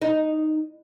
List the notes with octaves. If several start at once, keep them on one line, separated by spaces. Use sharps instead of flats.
D#4